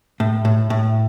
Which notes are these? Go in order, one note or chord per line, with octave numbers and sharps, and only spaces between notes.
A2
A2
A2